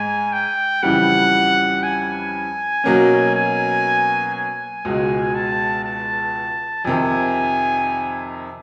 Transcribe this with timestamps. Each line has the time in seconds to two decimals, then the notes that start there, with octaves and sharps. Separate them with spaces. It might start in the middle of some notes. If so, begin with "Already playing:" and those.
Already playing: G#2 G#3 G#5
0.33 G5
0.83 F2 C#3 E3 G3 F#5
1.83 G#5
2.84 B2 F#3 A#3 C#4
3.34 G#5
4.35 G#5
4.85 C#2 B2 G#3
5.35 A5
5.84 A5
6.85 F2 C3 D#3 G#5